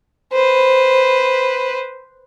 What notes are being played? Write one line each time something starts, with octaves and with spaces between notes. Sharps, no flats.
B4 C5